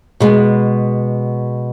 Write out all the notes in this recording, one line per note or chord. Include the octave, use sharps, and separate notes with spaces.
B2 G#3 B3